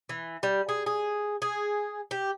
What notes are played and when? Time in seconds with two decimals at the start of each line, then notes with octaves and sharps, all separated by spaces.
0.09 E3
0.43 G3
0.69 G#4
0.86 G#4
1.42 G#4
2.11 G4